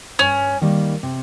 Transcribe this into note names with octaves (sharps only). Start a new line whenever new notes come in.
G2 C#4
D#3 G3 A#3
C3